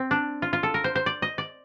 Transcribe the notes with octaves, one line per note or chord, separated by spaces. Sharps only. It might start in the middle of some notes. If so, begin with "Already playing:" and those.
Already playing: C4
D4
F4
F4
A4
A#4
C5
C5
D5
D#5
D5